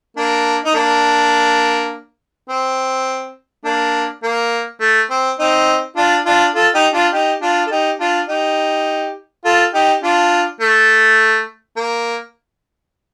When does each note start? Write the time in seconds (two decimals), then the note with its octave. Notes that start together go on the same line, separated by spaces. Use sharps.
0.17 A#3 D4
0.64 D#4
0.74 A#3 D4
2.49 C4
3.65 A#3 D4
4.23 A#3
4.81 A3
5.10 C4
5.39 C4 D#4
5.97 D4 F4
6.26 D4 F4
6.55 F4 A4
6.74 D#4 G4
6.94 D4 F4
7.13 D#4 G4
7.42 D4 F4
7.66 A4
7.71 D#4 G4
8.00 D4 F4
8.29 D#4 G4
9.45 F4 A4
9.74 D#4 G4
10.03 D4 F4
10.61 A3
11.77 A#3